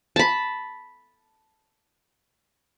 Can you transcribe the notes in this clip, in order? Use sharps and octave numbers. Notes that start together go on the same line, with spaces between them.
A5 B5